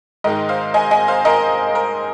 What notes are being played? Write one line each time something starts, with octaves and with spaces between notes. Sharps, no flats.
G#2 D#3 G#3 D#4 A#4 D#5
C5 F5
D#5 G#5
D#5 G#5
C5 F5
A#4 D#5
A#4